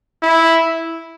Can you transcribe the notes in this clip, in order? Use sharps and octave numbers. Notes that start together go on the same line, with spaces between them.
E4